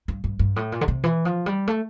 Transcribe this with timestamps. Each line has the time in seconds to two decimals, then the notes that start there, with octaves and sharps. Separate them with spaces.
0.08 G2
0.24 G2
0.39 G2
0.56 A2
0.72 A#2
0.81 D3
0.88 C3
1.04 E3
1.25 F3
1.46 G3
1.67 A3